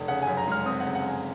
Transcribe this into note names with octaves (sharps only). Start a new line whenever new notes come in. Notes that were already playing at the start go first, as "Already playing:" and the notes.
Already playing: F1
C#3 F#5
F#2 G#5
A#5
G#3 F6
C4 D#6
F#5
C#3
F#5
F#2
G#5